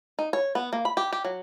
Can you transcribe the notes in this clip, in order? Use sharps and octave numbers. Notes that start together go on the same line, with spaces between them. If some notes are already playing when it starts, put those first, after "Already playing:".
D#4
C#5
B3
A#3
B5
G4
G4
F#3